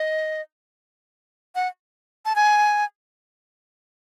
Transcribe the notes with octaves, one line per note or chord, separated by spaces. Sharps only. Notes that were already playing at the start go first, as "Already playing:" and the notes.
Already playing: D#5
F#5
A5
G#5